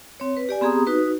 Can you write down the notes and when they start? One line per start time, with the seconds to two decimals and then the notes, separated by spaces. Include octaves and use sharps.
0.20 C4 C#5
0.37 B4
0.49 G4 D5 G#5
0.61 B3 C4 G4 G#4 A#5 D#6
0.87 D#4 F#4 B4